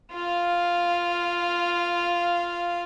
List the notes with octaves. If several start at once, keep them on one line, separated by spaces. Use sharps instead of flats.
F4 F5